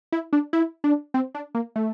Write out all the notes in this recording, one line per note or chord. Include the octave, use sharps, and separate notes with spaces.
E4
D4
E4
D4
C4
D4
A#3
A3